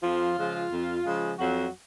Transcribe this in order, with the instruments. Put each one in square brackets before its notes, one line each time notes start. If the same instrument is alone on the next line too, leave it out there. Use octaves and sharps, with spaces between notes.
[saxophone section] F2 F3 F4
C#3 F3 G#3
F2
C#3 F3 G#3
F2 F#3 F#4